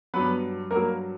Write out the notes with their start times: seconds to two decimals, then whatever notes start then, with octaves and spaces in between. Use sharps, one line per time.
0.14 G2 F#3 B3 B4
0.71 G2 F#3 A#3 A#4